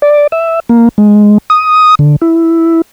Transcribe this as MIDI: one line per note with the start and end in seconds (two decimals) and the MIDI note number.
0.02 0.27 74
0.32 0.60 76
0.69 0.89 58
0.98 1.38 56
1.50 1.95 87
1.99 2.16 50
2.22 2.81 64